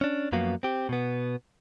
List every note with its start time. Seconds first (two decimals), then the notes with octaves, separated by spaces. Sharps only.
0.01 C#4 D4
0.32 F#2 F3 A#3 B3 F#4 F5
0.63 C4 G4
0.89 B2 B3